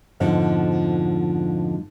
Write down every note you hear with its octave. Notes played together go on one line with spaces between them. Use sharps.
F2 G#2 B2 D3 F3